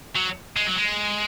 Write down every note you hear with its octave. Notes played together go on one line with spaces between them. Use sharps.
F#3
G#3
F#3
G#3